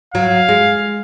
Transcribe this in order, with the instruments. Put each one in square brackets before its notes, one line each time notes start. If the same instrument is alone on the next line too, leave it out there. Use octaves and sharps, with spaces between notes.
[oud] F#3 [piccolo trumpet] F5
[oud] G#3